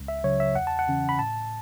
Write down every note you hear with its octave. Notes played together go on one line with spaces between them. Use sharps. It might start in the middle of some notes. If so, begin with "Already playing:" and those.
Already playing: C#2
E5
C#3 F#3 C#5
E5
E2 F#5
A5
F#5
C#3 E3 C#4
B5
A2 A5